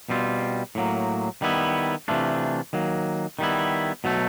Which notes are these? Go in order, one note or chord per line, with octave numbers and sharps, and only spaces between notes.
B2 G3 C4 F4
A2 F#3 A#3
D#3 G3 B3 E4
C3 E3 A3 D4 F4
D#3 F#3 A#3
D#3 G3 B3 E4
B2 F#3 A3